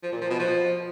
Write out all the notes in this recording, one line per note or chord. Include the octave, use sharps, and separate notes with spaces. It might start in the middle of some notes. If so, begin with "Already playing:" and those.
F3
A#2
F3
B2
F3